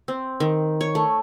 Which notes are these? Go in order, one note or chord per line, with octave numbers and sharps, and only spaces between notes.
C4
D#3
C#5
A3